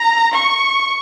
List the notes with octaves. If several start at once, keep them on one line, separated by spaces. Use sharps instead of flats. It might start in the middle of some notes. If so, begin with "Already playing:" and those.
Already playing: A#5
C#6